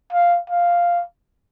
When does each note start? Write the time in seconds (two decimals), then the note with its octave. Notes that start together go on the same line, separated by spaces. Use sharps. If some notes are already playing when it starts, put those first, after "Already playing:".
0.12 F5
0.50 F5